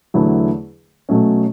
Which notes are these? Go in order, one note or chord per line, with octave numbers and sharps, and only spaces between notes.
E2 D3 F#3 A3 E4
B2 F#3 A3 C#4